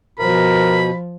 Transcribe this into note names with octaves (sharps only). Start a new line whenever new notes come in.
B2 F3 A#4 B5